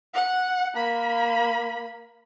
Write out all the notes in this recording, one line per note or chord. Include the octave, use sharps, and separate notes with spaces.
F#5
A#3 B5